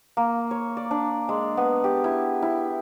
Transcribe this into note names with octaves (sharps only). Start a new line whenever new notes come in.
A#3
C#5
D5
D4
G#3
B3
G4
E4
E4